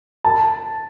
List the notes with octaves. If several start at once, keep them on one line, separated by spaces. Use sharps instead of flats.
A5